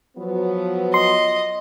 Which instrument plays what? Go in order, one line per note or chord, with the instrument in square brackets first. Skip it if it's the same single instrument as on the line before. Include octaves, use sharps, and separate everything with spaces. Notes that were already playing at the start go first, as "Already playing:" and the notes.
[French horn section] F3 F#3 B3
[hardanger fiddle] D#5 [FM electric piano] C6